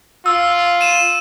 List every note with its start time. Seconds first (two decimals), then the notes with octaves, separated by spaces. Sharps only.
0.26 F4 E6
0.81 D#7 E7